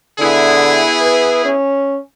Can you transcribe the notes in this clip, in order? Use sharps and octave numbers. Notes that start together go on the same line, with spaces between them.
D3 B3 E4 G#4
B4
C#4